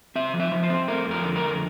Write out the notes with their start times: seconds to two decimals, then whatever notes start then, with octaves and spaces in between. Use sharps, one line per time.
0.15 C4 E5
0.34 F3
0.40 E5
0.52 F3
0.63 C5
0.70 C4
0.88 A3 A#4
1.06 F2 A#4
1.23 D3
1.36 A#4
1.42 F2